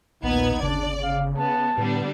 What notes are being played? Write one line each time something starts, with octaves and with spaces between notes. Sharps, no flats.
A#1 D#2 A#2 B3 D#4 G#6
G1 C#3 D4 D5
F5
B3 A5
A2 D3 G3 B3 D4